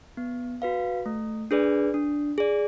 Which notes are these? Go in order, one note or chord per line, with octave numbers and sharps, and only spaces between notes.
B3
F#4 B4 F5
A3
D4 G#4 B4 D5
D4
G#4 D5